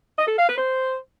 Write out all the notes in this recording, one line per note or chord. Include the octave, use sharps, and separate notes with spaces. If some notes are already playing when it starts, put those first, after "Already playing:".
D#5
A4
F5
B4
C5